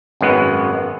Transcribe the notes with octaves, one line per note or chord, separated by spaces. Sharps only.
G#1 F#2 G#3 B3 F#5